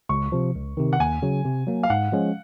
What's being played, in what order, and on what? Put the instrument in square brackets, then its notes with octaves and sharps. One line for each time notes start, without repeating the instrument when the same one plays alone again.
[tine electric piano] C#2 [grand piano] C#6
[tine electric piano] C3 F3
C#2
C3 D#3
[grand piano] F#5
[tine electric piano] D#2 [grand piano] G#5
[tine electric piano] C#3 F#3
C3
F#3 A#3
[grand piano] F5
[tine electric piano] G#2 [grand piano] F#5
[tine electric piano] F3 G#3 C#4